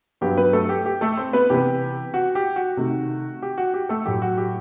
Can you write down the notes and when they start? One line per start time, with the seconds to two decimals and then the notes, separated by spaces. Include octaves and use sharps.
0.21 G2 F#3 B3 G4
0.37 B3 B4
0.53 A3 A4
0.69 G4
0.86 G4
1.01 A3 A4
1.17 C4 C5
1.33 B3 B4
1.50 C3 E3 B3 G4
2.14 F#4
2.35 G4
2.56 F#4
2.77 C3 D#3 A3
3.42 G4
3.58 F#4
3.74 G4
3.89 A3 A4
4.05 A2 F#3 A3 G4
4.22 F#4
4.38 G4